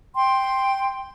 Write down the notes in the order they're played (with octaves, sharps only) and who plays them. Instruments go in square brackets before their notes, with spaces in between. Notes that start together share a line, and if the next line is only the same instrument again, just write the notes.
[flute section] G5 C6